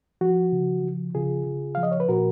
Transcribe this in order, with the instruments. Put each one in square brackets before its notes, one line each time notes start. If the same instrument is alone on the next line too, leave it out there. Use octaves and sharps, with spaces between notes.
[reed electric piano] F3 F#4
C#3
F3
C#3 F4 G#4
C#3
F3 F5
D#5
C#5
B4
A#2 F#4 A#4